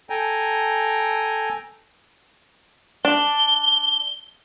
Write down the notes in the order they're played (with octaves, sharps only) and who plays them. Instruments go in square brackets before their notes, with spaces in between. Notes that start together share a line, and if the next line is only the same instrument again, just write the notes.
[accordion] A4 G5 G#5 A#5
[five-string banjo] D4 [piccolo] G7